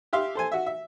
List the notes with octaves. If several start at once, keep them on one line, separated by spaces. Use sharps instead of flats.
G4 E5 F5 C6
A4 C5 G#5
F#4 E5
E5